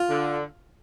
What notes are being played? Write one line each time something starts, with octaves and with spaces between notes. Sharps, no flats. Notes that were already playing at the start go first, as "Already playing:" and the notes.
Already playing: F4
D3